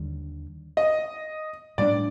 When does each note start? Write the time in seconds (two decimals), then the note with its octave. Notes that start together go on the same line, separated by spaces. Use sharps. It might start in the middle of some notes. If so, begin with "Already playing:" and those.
Already playing: D#2 D3 G3
0.77 D#5
1.78 A2 G3 A#3 D4 D5